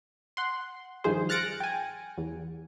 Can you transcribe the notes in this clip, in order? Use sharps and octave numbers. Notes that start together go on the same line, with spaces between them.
F#5 C6
G2 D#3 F3 G#4 C5
F6 F#6 A6 A#6 C#7 D7
G5 G#5
E2